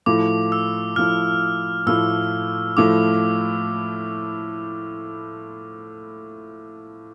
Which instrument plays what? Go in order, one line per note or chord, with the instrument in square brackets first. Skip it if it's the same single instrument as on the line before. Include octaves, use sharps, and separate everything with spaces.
[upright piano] A2 F3 A3 E4 [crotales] D6
[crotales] E6
[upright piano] A2 F3 A3 E4 [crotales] F6
[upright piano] A2 F3 A3 E4 [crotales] E6
[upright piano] A2 F3 A3 E4 [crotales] D6